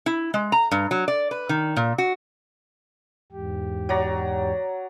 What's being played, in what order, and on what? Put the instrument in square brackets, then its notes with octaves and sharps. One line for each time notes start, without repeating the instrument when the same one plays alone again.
[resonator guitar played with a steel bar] E4
G#3
A#5
G2
F#3
D5
B4
D#3
A#2
F#4
[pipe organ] E2 G#2 G4
[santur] F#3 D5 A#5